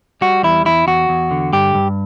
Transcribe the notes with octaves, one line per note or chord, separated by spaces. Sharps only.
G3 F#4
E2 E4
E2 E4
E2 F#4
E2
D3
G2 G4
G2